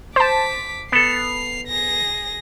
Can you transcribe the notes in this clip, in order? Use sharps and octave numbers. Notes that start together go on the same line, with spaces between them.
C5 A5 D6 B6
B3 A4 C7 F7
G#4 A#6